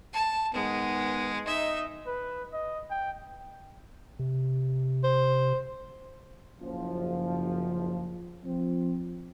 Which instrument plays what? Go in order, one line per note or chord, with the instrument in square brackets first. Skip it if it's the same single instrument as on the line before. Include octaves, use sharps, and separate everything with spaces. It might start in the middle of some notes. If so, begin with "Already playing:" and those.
[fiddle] A5
[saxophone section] G#2 D#3 B3 [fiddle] G#3
[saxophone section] D#4 D#5 [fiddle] E5
[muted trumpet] B4
D#5
G5
[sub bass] C3
[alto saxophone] C5
[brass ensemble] F#1 F3
F3 C4